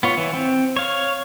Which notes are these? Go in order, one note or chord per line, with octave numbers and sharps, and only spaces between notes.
B3 F4 C#5
E3
C4
C#5 F5